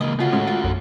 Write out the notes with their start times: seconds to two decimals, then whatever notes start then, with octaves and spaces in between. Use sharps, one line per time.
0.01 C#2 A#3 D#5
0.19 C#3 A3 F4 F#4
0.32 A2 G#3 C#4
0.47 F4
0.64 A#1 F#2